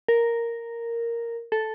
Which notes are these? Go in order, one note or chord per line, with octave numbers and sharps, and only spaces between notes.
A#4
A4